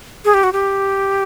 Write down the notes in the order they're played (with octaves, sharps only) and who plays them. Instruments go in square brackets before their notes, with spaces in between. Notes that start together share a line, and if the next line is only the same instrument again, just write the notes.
[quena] G#4
G4
F#4
G4